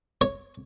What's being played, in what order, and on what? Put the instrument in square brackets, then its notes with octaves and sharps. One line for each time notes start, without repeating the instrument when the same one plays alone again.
[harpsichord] C#5